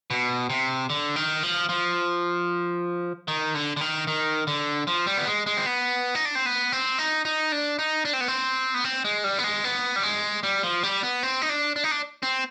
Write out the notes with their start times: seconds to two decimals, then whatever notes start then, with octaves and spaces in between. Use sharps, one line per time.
0.10 B2
0.50 C3
0.90 D3
1.16 D#3
1.43 F3
1.69 F3
3.28 D#3
3.55 D3
3.77 D3
3.81 D#3
4.07 D#3
4.47 D3
4.87 F3
5.07 G3
5.18 B3
5.27 G#3
5.46 G#3
5.57 C4
5.66 B3
6.15 D#4
6.25 D4
6.35 C4
6.46 B3
6.72 C4
6.99 D#4
7.25 D#4
7.52 D4
7.79 D#4
8.05 D4
8.13 C4
8.21 B3
8.28 C4
8.74 B3
8.84 C4
9.05 G#3
9.24 G3
9.39 B3
9.44 G#3
9.64 B3
9.96 G3
10.03 G#3
10.43 G3
10.63 F3
10.83 G3
11.03 B3
11.23 C4
11.42 D#4
11.49 D4
11.76 D4
11.84 D#4
11.91 D4
12.23 C4